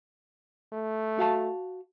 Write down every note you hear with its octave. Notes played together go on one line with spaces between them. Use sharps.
A3
F#4 F5 A5